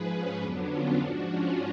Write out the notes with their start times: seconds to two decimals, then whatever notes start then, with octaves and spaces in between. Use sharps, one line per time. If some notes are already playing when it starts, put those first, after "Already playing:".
Already playing: G#2 F3 G#4 B4
0.13 C#4
0.42 F2 D3 F#3 B3 D4
0.72 C#4 F4
1.00 G#2 F3 D4 F#4
1.30 C#4 F4